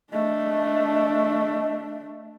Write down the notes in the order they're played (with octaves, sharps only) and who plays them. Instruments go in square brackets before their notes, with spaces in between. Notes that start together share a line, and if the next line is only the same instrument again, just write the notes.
[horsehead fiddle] A3 D4 [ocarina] D#5